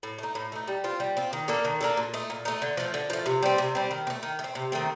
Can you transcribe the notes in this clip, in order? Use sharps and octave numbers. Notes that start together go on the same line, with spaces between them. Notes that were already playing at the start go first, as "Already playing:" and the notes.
A2
A3 D#4
A2
A3 D#4
G3
C4 F4
G3
C4 F4
D#3
A#3 D4 A4
D#3
A#3 D4 A4
A#2
A3 D#4
A#2
A3 D#4
D3
F3 A3
D3
F3 A3
C3
G3 C4
C3
G3 C4
D#3
C4
A3
D#3
A3
C4
C3
D#3 A3 C4